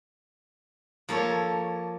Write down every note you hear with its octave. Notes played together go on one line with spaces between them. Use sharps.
F3 A#3 A4 C#5